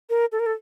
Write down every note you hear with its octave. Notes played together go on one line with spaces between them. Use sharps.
A#4
A4
A#4
A4